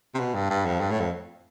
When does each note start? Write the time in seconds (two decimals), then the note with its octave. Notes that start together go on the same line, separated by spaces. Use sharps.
0.15 C3
0.19 B2
0.34 G2
0.50 G2
0.65 F2
0.80 G2
0.90 A2
1.00 F2